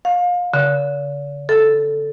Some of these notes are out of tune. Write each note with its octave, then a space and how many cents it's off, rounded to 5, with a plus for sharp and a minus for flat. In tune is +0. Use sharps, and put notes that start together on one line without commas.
F5 +30
D3 -45
A4 +0